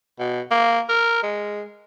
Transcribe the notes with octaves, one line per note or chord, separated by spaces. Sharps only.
B2
A#3
A#4
G#3